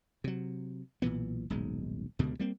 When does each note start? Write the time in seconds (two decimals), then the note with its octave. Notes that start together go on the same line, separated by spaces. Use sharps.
0.24 C3 F#3
1.02 B1 A#2 E3 B3
1.50 D#1 B1 G#2 G#3
2.19 C#2 G2 B2 D3
2.40 G3 A#3 C4